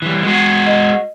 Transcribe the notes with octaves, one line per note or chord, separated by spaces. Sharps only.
E3 G3
G#3 F#4
D#5